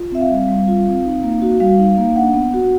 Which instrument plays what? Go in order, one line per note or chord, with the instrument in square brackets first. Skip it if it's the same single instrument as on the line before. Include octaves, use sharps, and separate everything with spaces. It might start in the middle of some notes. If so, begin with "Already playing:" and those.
Already playing: [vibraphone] F4
C4 E5
F5
G3
G3
F4
C4
D#4
A#3
F#4
G3 F5
D#4
A#3
D4 F#5
B3
F#4